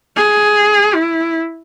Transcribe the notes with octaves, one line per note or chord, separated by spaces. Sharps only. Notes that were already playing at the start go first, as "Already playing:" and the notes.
G#4
E4